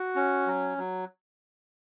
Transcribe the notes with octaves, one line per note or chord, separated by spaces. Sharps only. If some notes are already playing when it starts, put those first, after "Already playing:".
Already playing: F#4
C#4
F#3
F#3